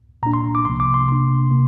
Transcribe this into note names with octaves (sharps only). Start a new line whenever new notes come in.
A#2 A#3 D4 A#5
C6
D6
C2 C3 F3 A#3 C6
D6
C6
C3 A#3 D4 C6
C3 A#3